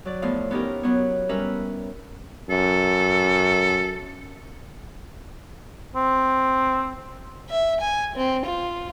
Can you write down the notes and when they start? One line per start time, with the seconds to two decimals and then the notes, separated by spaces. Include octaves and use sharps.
0.05 F#3 D5
0.22 A2 F3 A3 B3 F5
0.51 B3 C#4 D#4 G4 A#4
0.83 F#3 B3 C#5
1.29 G3 C#4 A#4 B4 E5
2.50 F#2 A4
5.95 C4
7.50 E5
7.80 G#5
8.16 C4
8.46 F4